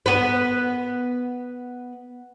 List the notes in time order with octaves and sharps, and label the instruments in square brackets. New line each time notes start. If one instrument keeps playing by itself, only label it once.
[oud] B3 B4